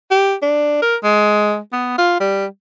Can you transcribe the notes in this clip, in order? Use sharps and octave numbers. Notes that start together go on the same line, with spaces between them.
G4
D4
A#4
G#3
B3
F4
G3